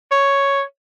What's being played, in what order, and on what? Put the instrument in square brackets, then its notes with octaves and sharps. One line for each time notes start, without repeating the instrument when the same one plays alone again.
[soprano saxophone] C#5